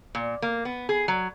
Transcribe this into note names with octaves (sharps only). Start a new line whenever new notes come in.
A#2
A#3
B3
G#4
F#3